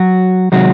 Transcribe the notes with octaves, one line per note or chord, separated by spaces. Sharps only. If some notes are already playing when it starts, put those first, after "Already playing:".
Already playing: F#3 F#4
C3 D#3 F#3 G#3 F#4